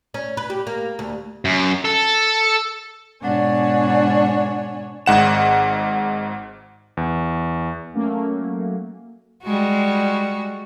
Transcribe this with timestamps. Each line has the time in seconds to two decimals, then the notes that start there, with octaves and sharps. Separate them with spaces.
0.14 C#4
0.37 B4
0.50 G4
0.67 A#3
0.99 D2
1.45 F#2
1.85 A4
3.22 G#2 B2 D4 C#5 F#5 G#5
5.06 G#1 G#2 F#5 E7
6.97 E2
7.94 F#3 A3 A#3 C#4
9.44 G3 G#3 F#4